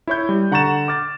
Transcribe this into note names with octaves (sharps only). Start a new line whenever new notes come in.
E4 C#5 G6
G3
D3 F#5 A#5 C#6 A6 E7
D6 F6 A6